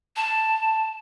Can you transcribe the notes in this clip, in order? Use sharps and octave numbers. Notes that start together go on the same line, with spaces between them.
A5